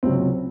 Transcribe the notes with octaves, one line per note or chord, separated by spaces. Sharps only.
C#2 C3 F#3 C4